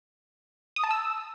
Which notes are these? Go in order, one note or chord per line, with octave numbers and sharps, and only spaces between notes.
D#6
A5
E6